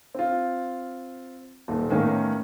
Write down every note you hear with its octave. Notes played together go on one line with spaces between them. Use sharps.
C4 F4
D#1 A#2
E2 A2 D#3 A#3 C#4